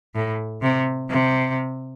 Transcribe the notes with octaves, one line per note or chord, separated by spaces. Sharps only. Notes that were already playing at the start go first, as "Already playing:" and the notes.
A2
C3
C3